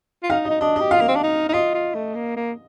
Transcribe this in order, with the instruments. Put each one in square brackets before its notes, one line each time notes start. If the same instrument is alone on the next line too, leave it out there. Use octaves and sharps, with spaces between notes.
[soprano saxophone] F4
[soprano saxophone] D#4 [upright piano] F5
[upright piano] D#5
[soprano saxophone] D#4
[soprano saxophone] D4 [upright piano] D#5
[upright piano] D#5
[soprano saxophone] G4
[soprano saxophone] F4 [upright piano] F5
[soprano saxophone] A#3
C4
D4
D#4
D#4
[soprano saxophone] F4 [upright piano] D#5
[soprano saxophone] F4
A3
A#3
A#3